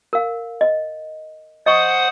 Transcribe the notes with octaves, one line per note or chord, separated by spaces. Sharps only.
A#4 F5
D#5
C5 D#5 F#5 C#6 D#6